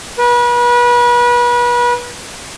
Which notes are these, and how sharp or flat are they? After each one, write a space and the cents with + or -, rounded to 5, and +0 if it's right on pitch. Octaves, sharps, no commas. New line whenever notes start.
B4 -35